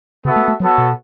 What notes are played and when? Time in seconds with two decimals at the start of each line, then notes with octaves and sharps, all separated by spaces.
0.24 C#3 B3 F#4 A4 E5
0.36 A3
0.48 A3
0.60 F#3 B3 F#4 A4 C#5
0.78 B2